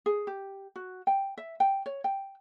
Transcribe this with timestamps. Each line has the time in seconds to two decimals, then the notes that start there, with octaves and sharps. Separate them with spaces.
0.06 G#4
0.27 G4
0.76 F#4
1.07 G5
1.37 E5
1.60 G5
1.86 C#5
2.04 G5